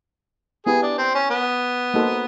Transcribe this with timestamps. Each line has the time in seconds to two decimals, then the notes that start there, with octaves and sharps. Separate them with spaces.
0.66 B3 E4 G4 G#4 B4
0.82 D4
0.98 C4
1.14 C#4
1.30 B3
1.94 A#3 D#4 F#4 A4 C5